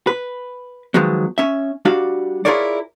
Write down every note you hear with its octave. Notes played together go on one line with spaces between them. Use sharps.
B4
D#3 F3 F#3 G#3 B3
C#4 E5
G3 D4 F#4 F5
E4 F4 G#4 A#4 C#5 D5